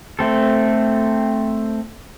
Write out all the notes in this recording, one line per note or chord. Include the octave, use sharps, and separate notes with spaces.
A3 C4 A4